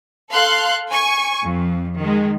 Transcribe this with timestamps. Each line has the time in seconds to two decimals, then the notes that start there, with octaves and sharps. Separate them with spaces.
0.33 A4 F5 C6 F#6
0.90 G#5 C#6
1.44 F2
1.99 D#3 G#3